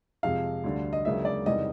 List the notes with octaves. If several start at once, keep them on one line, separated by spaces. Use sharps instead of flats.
F2 C3 F3 G#3 F5
D2 D3 G3
D#5
C#2 C#3 F#3 A#3 D4 E5
D5
E2 C3 D#3 G3 D#5